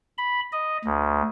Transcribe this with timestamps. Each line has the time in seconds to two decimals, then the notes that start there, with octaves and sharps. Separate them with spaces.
0.18 B5
0.52 D#5
0.85 D2